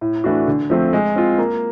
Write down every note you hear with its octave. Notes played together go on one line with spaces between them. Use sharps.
A2
E3 A3 D4 F#4
D3
F3 A3 C4
G#3
C4 F4
A#3